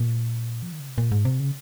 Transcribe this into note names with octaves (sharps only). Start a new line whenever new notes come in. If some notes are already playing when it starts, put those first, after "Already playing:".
Already playing: A#2
F3
D#3
C#3
C3
A#2
G#2
C3
C#3